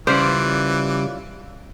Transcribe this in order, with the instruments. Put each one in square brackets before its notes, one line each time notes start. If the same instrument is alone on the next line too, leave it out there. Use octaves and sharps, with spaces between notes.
[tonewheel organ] C#3 G3 D6 [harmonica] E3 [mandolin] C#4 F4 D5 [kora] C5